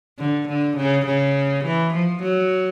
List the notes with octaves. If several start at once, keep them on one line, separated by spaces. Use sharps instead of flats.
D3
D3
C#3
C#3
E3
F3
F#3